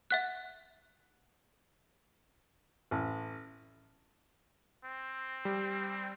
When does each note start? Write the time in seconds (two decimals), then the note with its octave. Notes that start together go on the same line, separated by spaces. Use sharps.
0.11 E5 F#5 F#6
2.91 A1
4.85 C4
5.45 G3